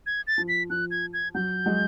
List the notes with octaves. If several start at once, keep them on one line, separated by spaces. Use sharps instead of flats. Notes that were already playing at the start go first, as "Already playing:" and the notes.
G#6
A6
F3
B6
F3 F#6
G#6
G#6
F#3 G6
F#3 G#3